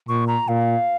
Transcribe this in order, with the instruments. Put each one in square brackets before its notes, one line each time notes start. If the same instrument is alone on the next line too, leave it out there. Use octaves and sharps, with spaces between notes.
[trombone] A#2 [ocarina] C#6
[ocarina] A#5
[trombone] A#2 [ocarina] F5